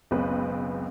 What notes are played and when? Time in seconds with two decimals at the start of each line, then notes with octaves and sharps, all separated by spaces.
0.11 F#1 C#2 B2 C4 B4